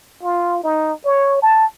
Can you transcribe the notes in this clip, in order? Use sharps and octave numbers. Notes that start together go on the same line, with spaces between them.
F4
D#4
C#5
A5